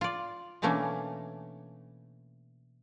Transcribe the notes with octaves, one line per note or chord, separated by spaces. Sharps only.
F4 D5
B2 E3 A3 A#3 C#4 D4